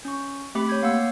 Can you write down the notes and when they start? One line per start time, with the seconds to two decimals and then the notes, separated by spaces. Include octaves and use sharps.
0.05 C#4 C#6
0.55 A3 C4 G4 B5 D6 B6
0.69 C#5 G6 G#6
0.82 A#3 F5 F#5 E6